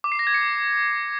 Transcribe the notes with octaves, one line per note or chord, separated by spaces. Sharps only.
D6
C7
A#6
G#6
C#7